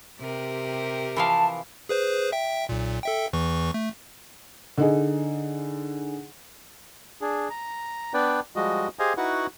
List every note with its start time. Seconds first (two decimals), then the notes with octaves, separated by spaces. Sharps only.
0.20 C3 G4 A#4
1.16 E3 F3 F5 A5
1.89 G#4 B4 C5
2.32 E5 G5
2.69 B1 A#2
3.03 A4 E5 G5
3.33 E2 E3 C#6
3.74 A3
4.78 D3 D#4 G#4
7.21 D4 G#4
7.50 A#5
8.14 B3 D4 B4 D5 G5
8.56 F3 G3 G#3 F#4 D#5
8.99 G4 G#4 C5 D#5 F5 G#5
9.17 D#4 E4 F#4 B4 F#5 C#6